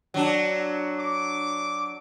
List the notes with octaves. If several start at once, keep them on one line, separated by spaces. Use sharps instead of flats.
F#3 D4
D6